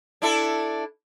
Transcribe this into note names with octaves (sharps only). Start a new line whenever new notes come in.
D4 E4 A4